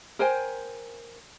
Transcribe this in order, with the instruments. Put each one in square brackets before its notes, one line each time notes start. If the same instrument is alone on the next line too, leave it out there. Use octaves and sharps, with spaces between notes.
[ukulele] A#4 C5 G5 G#5